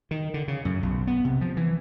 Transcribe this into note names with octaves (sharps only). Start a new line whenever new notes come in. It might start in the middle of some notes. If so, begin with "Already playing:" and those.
D#3
D3
C#3
F#2
B1
B3
C3
F3
E3